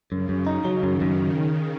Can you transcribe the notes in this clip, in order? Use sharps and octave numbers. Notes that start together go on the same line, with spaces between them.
F#2 C#3
F#2
C#3 D#4
F#3
F#2 D#3
F#2